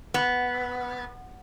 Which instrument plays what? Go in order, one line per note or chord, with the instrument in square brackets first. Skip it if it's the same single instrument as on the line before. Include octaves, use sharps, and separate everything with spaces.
[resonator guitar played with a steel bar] B3